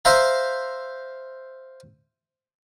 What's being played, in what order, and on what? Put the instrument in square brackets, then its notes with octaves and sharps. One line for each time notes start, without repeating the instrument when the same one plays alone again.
[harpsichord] C5 E5 F5 A#5